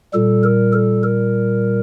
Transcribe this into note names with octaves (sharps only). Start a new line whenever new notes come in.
A#2 G3 A4
A#4
A4
A#4